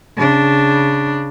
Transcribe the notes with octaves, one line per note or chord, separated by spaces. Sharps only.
C#3 D4